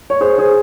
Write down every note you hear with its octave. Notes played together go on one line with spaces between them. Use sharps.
C#5
G#4 C5
G#4 C5